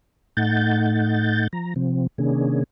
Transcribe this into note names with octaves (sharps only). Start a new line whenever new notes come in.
A2 A3 D#4 F#5 G6 A6
F3 A#5
C3 F3 C4
C3 D#3 A#3 C#4 D4 G#4